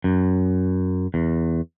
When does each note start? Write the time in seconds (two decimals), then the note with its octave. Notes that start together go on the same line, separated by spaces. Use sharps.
0.04 F#2
1.14 E2